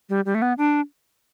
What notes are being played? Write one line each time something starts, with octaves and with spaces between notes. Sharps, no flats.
G3
G3
A3
B3
D4